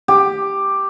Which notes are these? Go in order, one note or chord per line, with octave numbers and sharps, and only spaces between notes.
G4